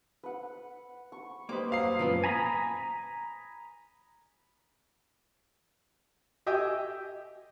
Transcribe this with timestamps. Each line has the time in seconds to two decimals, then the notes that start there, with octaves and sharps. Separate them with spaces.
0.24 B4 F#5
1.12 C#6
1.49 G3 A#3 B4 C5 D#5 D6
1.72 F#3 F5 D#6 E6 C7
1.99 F#2 A#2 F3 A3 B3 C#4
2.24 G#5 A#5 B5 D#6
6.46 G4 D#5 E5 G5 G#5